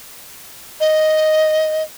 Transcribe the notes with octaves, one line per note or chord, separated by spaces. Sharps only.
D#5